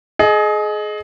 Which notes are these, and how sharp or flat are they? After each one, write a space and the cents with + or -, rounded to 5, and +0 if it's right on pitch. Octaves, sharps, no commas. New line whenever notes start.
G#4 +30 D#5 -10